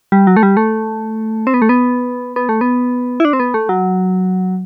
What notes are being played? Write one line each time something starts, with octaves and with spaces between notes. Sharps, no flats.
G3
F#3
A3
G3
A3
C4
B3
A3
B3
B3
A3
B3
E4
D4
C4
B3
A3
F#3